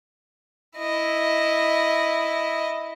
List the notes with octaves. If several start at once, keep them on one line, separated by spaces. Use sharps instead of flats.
E4 D#5